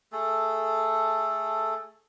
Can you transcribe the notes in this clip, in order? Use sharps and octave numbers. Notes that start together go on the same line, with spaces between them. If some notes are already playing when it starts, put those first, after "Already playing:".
A3 G#4 A4